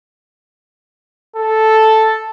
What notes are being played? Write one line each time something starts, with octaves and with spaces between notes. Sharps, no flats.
A4